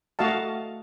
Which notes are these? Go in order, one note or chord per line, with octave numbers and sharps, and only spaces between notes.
A3 F#4 D#5 F5 A5